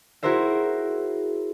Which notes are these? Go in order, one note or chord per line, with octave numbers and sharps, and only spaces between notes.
E4 F#4 G#4 A#4 C5 E5